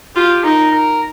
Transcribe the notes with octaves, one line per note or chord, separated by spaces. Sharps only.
F4 G4
D#4 A#4
A#4